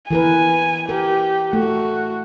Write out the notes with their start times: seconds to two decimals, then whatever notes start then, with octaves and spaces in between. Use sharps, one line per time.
0.11 E3 A#4 B4 G#5
0.89 G4 A#4
1.53 A3 F#4